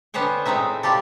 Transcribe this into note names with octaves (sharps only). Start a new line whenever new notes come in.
D3 B3 C#4 C5 C#5 G5
A2 G#3 C4 D#4 E5
G3 F4 G4 A4